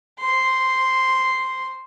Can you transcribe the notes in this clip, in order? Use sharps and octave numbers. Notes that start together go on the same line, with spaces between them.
C5 C6